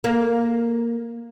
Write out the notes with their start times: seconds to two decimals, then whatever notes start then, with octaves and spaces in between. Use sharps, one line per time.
0.04 A#3